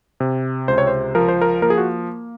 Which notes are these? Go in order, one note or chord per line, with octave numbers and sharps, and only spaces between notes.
C3
C#2 C5
C#5
C5
F3 A#4
C5
A#4
A#3 A#4
G#4
F#4